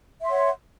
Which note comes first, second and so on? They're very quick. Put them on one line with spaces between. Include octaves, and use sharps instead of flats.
E5 C6 C#5 F#5